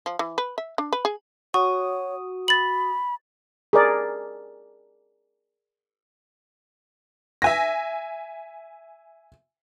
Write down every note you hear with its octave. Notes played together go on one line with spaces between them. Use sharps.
F3
E3
B4
E5
D4
B4
G#4
F#4 C#5 C#6 D#6
B5 A6 F#7
G#4 A#4 D5
E5 G#5 A#6